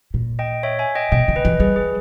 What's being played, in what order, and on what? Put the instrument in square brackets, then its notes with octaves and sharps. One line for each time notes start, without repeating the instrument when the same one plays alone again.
[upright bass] A#2
[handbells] D#5 G5
C#5 E5
E5 G#5
D#5 G5
[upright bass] B2 [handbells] D#5 G5
[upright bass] C#3
[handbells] B4 D#5
[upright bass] E3
[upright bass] G3 [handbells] G#4 B4
[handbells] G#4